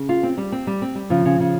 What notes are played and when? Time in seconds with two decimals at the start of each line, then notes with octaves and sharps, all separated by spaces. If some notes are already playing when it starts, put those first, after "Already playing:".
Already playing: C#3
0.09 F4
0.23 C4
0.38 G3
0.52 C4
0.67 G3
0.82 C4
0.95 G3
1.10 C#3 F3
1.25 C#3
1.40 C#3